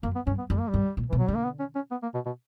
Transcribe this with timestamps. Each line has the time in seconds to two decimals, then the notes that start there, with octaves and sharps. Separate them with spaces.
0.03 F#2 A#3
0.15 B3
0.27 G2 C#4
0.38 B3
0.50 F#2 G3
0.59 A#3
0.69 G3
0.74 G2
0.97 A#2
1.10 B2 E3
1.18 F#3
1.27 D3 G3
1.35 A#3
1.44 B3
1.59 C#4
1.75 C#4
1.91 B3
2.02 A#3
2.14 B2
2.26 B2